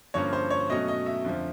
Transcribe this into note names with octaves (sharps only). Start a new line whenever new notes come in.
G2 D3 F3 A#3 C#4 C#5
C5
C#5
B2 F#3 A3 C#4 D#5
D#5
E5
F2 D3 F3